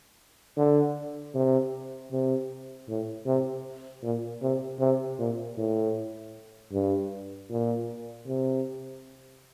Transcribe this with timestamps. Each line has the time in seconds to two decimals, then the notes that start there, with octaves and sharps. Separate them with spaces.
0.57 D3
1.35 C3
2.12 C3
2.89 A2
3.26 C3
4.03 A#2
4.42 C3
4.80 C3
5.18 A#2
5.58 A2
6.73 G2
7.50 A#2
8.27 C3